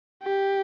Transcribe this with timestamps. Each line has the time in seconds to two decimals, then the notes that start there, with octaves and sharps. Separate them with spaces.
0.23 G4